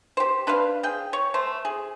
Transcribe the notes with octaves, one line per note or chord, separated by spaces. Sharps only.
G4 C5
D4 B4 C5 F5
G#4 G5
C#5
A3 C5
G#4